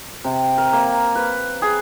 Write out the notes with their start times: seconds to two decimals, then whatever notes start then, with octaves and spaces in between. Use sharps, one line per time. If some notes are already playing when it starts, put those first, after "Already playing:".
0.25 C3
0.58 A#4
0.73 A#3
1.15 B4
1.62 G#4